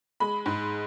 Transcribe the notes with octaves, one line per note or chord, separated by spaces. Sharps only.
G#3 B5
G#2